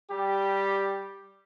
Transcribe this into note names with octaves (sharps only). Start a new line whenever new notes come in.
G3 G4